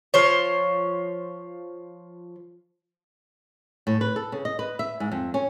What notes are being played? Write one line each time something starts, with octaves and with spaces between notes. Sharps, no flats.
F3 C5 C#5
A2
B4
A4
C#3
D#5
B4
E5
G#2
F2
C#4